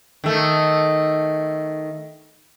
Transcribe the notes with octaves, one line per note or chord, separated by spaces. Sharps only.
D#3 A3